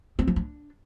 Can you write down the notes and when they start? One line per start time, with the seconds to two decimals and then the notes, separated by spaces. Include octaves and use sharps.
0.19 C4
0.27 F3
0.36 D4